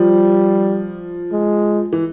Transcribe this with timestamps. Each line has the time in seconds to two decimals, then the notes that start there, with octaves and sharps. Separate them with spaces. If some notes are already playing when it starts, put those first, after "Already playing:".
Already playing: F3 G3
1.32 G#3
1.93 E3